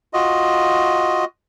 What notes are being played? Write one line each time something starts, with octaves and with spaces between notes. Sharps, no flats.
F4 F#4 D#5